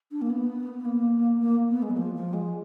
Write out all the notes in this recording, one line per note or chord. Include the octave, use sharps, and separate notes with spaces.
D4
A#3
B3
A#3
A#3
B3
G#3
F#3
F3
F3
G#3